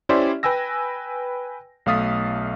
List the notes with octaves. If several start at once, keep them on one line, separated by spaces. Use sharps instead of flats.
C#4 E4 G4 C5 D5 E5
B4 G5 G#5 E6 A#6
B1 A3 F5 D#6 A6 B6